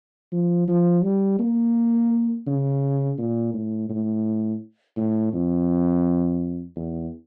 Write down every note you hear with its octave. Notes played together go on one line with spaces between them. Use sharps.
F3
F3
G3
A#3
C#3
A#2
A2
A2
A2
F2
E2